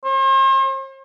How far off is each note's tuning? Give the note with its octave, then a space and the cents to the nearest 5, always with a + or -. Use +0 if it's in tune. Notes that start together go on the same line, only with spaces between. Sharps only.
C5 +45